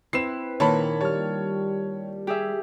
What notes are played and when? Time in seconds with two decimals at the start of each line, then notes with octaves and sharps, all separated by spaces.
0.13 C4 E4 B4 C7 E7
0.60 A#2 D#3 A#3 C#5 A5 B5
1.01 G3 C#5 A5 F6
2.27 G4 G#4 E5